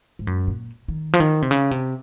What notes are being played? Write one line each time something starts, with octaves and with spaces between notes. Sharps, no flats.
G#2
F#2
A#2
D#3
F3
D#3
C3
C#3
C3